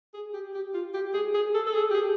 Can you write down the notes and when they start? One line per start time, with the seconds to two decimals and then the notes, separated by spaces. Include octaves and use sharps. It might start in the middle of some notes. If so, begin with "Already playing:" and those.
0.14 G#4
0.33 G4
0.54 G4
0.74 F4
0.94 G4
1.14 G#4
1.34 G#4
1.54 A4
1.67 A4
1.74 G#4
1.91 G4
1.94 G#4